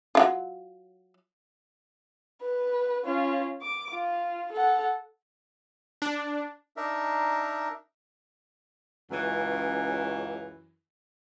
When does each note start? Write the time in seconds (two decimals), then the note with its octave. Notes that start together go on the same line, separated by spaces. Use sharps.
0.15 F#3 E4 F4
2.41 B4
3.04 C#4 F4
3.62 D6
3.93 F4
4.52 A4 F#5
6.02 D4
6.77 D4 D#4 A#4 E5
9.11 C#2 F#2 E3